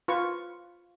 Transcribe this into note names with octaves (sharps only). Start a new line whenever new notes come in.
F4 B4 C#6